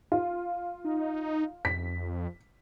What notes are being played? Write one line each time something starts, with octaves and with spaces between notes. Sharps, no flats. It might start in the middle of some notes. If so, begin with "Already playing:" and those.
F4
D#4
F2 B6